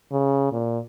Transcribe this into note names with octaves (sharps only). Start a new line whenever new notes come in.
C#3
A#2